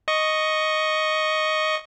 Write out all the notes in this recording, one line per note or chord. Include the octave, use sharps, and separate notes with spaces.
D#5 C#6